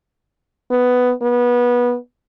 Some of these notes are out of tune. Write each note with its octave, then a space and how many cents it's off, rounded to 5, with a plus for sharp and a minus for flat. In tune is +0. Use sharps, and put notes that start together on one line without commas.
B3 +10
B3 -20